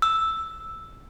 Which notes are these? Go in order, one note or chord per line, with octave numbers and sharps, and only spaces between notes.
E6